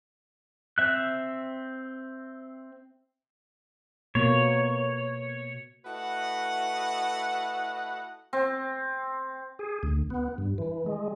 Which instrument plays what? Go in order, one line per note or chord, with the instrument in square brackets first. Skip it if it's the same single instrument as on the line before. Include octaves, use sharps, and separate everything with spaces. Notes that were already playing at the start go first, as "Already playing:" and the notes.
[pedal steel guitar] C4 E5 F#6
[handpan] B2 A#3 [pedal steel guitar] C#5
[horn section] A3 E4 F#4 B4 D#5 F#5
[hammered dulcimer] C4
[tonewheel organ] G#4
D2
B3
G2
E3
G#3